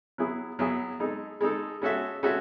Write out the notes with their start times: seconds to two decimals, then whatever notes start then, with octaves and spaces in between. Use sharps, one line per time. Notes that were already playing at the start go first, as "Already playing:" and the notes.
0.18 F#3 B3 E4 G#4
0.59 F#3 B3 E4 G#4
1.00 G#3 D#4 A4
1.41 G#3 D#4 A4
1.82 G#3 C#4 F#4 A4 E5
2.23 G#3 C#4 F#4 A4 E5